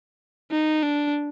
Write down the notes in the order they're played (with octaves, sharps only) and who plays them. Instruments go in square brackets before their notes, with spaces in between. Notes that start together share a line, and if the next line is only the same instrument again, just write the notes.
[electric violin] D#4
D4